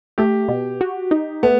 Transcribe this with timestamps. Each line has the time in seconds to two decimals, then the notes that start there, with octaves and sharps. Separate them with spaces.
0.18 A3 G4
0.48 B2
0.81 F#4
1.11 D#4
1.43 A3 B3